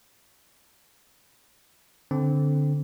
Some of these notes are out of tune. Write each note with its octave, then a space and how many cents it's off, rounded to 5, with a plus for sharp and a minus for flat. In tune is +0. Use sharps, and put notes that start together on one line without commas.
D3 -5 C4 +0